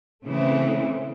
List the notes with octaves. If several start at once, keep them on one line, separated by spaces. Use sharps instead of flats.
C#3 E3 A3 C4